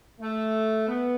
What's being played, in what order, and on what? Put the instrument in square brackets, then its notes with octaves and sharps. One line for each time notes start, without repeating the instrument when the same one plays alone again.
[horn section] A3
B3